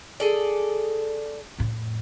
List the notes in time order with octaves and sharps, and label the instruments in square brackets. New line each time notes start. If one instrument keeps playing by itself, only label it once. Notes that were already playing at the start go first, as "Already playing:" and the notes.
[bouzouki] G#4 A4 D5
[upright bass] F2 A2